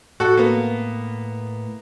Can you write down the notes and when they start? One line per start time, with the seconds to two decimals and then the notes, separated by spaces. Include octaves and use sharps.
0.20 A2 F#4 A4
0.37 A#3 B3